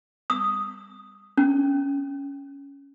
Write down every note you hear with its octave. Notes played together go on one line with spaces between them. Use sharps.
D#6
C#4